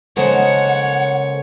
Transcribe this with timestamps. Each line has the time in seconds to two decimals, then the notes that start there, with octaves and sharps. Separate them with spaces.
0.17 C#3 G#3 A#3 A4 C5 C#5 F#5